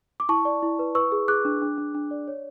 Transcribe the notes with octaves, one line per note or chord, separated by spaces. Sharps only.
D6
E4 A5 C#6
D5
E4
B4
B4 C#6 E6
G#4
G#4 D6 F#6
D4
D4
D4
D4
D5
C#5